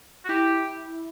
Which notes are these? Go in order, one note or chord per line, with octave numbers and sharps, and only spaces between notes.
F#4
E4 G4